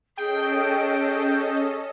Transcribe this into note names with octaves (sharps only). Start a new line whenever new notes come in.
C#4 G#4 A4 D#5 G5